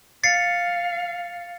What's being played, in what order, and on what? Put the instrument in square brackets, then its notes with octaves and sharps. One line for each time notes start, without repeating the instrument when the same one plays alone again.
[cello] F5 [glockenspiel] A6 C7 C#7